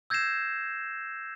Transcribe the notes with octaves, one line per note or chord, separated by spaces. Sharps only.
E6 G6 G#6 A#6 C7 E7